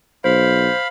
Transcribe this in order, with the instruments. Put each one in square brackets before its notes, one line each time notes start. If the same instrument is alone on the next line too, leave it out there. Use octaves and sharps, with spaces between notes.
[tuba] B1 [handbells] C5 [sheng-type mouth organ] F5 B5